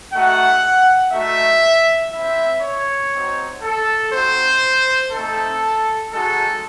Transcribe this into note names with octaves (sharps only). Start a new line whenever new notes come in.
A3 D#4 F#4 F#5
A3 D#4 F#4 E5
C4 E4 E5
C#5
C4 D#4 F#4
A4
C4 D#4 F#4 C5
A3 C4 D#4 A4
G#3 D#4 F#4 A4